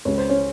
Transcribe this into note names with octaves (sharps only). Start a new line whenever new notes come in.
C#2 C#3 G#3 C#5
C5
C#4 C#5